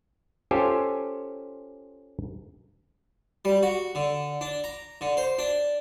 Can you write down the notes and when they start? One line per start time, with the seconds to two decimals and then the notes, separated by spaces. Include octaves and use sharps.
0.51 C#4 F4 G4 A4 C5 G#5
3.45 G3
3.63 F#4
3.95 D3
4.41 D4
4.64 A#5
5.01 D3
5.17 C5
5.38 D4